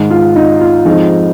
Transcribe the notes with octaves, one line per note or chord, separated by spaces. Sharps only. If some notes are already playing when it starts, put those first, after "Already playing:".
Already playing: G#2 D#3 G#3
F4
D#4
F4
F2 F3 G#3 D#4